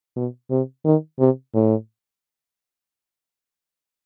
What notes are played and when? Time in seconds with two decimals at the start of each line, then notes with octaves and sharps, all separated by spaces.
0.16 B2
0.50 C3
0.85 D#3
1.19 C3
1.54 A2